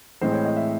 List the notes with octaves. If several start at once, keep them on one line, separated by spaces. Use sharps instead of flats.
A2 E3 G#3 C4 C5
C#5
D#5
E5